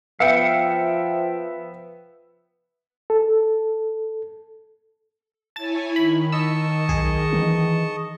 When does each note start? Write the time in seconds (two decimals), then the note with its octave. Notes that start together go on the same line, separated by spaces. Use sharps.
0.20 F3 B3 E5 F5 G5 C#7
3.10 A4
5.56 E4 C#5 G#5 A5 A6
5.96 D#3 B5
6.32 D#5 A5 C#6 E6
6.89 B1 G#4
7.33 E3